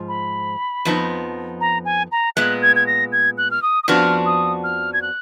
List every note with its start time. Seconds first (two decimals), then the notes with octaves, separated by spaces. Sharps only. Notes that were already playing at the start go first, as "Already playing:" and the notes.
Already playing: G#2 F3
0.08 B5
0.85 F2 F3 B3 D#4
1.61 A#5
1.85 G#5
2.12 A#5
2.36 A#2 G#3 B3 F#6
2.62 G#6
2.76 G#6
2.87 A#6
3.12 G#6
3.38 F#6
3.51 F6
3.62 D#6
3.84 D#6
3.88 F2 F3 B3 D4 F#4 F6
4.26 D#6
4.64 F6
4.94 G#6
5.02 F#6